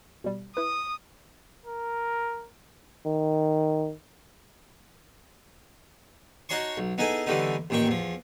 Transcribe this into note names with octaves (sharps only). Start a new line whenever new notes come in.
B2 G3
E4 B4 D#6
A#4
D#3
D#4 F#4 C#5 A5 C6 C#6
B1
B3 D#4 E4 G#4 A4
D3 E3 G3 A3 B3 D#4
A1 A#2 D#3 G5 C#6
E2 F3